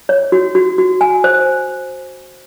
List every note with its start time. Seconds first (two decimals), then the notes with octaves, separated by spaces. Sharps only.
0.09 C#5
0.32 F#4
0.55 F#4
0.78 F#4
1.01 G#5
1.24 C5